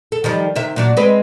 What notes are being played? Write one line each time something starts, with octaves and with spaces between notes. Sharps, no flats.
A4
D#3 F3 G3
C3 D#3 E5
A#2 F#3 D4
G#3 C4 B4